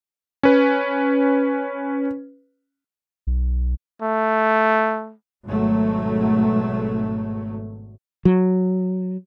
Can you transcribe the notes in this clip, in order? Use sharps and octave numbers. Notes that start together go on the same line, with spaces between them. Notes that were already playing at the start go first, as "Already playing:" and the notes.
C#4 B4
B1
A3
G#1 B2 F#3 A3
F#3